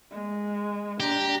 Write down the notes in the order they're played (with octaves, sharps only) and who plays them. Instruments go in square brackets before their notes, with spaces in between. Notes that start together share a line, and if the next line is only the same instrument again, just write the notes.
[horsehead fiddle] G#3
[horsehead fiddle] D4 A#5 [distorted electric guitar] G4